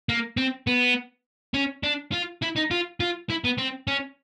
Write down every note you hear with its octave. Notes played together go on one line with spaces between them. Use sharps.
A#3
C4
B3
C#4
D4
F4
E4
D#4
F4
F4
E4
B3
C4
C#4